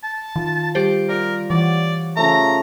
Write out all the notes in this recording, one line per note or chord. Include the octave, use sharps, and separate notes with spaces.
A5
D#3 F4
G3 G4 C5
F4 A#4 D5
E3 C#5 D5 F#5
C#3 F3 A3 A#5